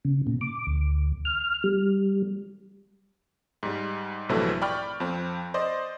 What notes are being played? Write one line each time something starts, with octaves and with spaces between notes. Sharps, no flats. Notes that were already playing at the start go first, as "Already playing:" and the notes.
C#3
A#2
D6
D2
F6
G3
G#2 G3
A#1 G2 C3 E3 F#3 A3
D5 G5 B5 C#6 F6
F2 C4
C5 D5 D#5